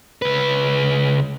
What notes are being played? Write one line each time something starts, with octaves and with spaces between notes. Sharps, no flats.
C#2 B4